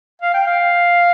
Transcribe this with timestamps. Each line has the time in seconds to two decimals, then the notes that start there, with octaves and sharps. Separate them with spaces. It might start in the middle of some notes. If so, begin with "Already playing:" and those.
0.22 F5
0.34 G5
0.47 F5